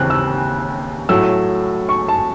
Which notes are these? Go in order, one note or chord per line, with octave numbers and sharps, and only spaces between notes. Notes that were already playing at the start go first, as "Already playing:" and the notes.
Already playing: D#2 C#3 E3 C4 F#6
E6
A2 F#3 A3 E6
C#6
A5